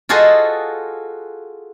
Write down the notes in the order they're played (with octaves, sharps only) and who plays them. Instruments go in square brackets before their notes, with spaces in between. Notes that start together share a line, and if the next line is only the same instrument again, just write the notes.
[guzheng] F4 F#4 G#4 A4 C5 D#5